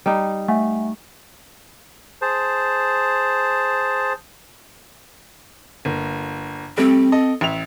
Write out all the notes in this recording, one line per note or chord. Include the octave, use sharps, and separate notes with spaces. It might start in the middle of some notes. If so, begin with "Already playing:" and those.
G3 D#4
A3 E5 F#5 G#5
G#4 C5 A5
G1 A#3
G3 A3 C4
A4 D#5
A1 E5 F7